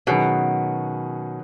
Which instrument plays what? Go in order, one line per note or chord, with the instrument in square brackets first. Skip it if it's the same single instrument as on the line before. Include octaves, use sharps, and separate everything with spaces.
[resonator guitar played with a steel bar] B2 [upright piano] D#3 F#3 C#4 G#4 B4